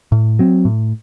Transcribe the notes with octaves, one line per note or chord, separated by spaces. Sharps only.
A2
F#3 C4
A2